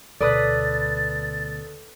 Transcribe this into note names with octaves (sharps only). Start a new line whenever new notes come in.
D2 B2 A4 B4 D5 D#6 F#6 A6